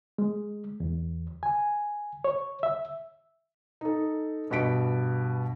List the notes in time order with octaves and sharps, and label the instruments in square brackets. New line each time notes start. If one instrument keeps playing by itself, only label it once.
[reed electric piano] G#3
E2
G#5
C#5
E5
[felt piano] D#4 A4
G2 B2 D#5 B6 D7